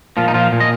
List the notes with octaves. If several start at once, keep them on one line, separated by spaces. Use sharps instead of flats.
A#2 F3 F4
D#4
F3 F4
A#2
D#5